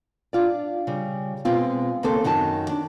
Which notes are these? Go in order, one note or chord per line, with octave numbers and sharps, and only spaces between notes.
D4 F4 D5
C#3 G3
B2 G#3 C4 F4
D#2 C#3 C4 A4 C5
F#2 D#3 F#3 C#4 A5
D4